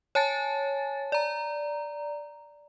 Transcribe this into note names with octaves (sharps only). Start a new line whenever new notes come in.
C#5 G#5 A5 A6
D5 A#5